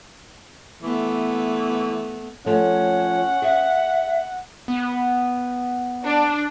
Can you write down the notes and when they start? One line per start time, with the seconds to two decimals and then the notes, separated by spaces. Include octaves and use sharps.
0.83 E3 A3 B3
2.46 F3 A3 C#4 C#5 F#5
3.42 G#4 E5
4.68 B3
6.05 D4